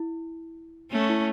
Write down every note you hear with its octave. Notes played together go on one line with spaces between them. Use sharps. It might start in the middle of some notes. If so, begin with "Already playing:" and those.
Already playing: E4
A3 C#4
E4